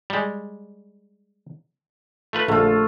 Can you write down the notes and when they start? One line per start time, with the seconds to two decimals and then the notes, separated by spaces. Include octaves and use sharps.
0.10 G3 G#3
2.33 A3 F4 B4
2.48 A#1 D3 A3 F4